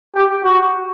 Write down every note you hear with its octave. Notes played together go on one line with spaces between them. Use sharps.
G4
F#4